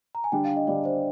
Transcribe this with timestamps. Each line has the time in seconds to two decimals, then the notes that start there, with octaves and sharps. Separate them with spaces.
0.15 A#5
0.24 G#5
0.32 D3 G3 D4 G5
0.45 F5
0.56 D#5
0.67 D3 G3 D4 D5
0.85 C5